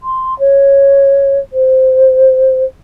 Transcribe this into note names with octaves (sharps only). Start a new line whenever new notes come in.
C6
C#5
C5